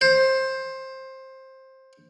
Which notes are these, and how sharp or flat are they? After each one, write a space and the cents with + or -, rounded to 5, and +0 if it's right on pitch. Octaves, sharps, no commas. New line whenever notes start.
C5 +15